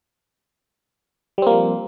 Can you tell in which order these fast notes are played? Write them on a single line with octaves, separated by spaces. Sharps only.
G3 C4 A#3 F3